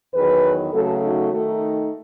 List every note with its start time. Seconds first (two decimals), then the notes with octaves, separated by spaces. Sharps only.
0.14 E2 D#3 F#3 G#4 B4
0.73 C#3 F#3 A3 F#4 A4
1.02 D#4 F#4
1.33 D#3 A3 D#4